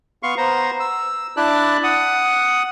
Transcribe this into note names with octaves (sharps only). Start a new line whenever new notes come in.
B3 F5 C6 C#6
B3 C5 A#5
E6
D4 E4 D5 A5 F#6
F#5 D#6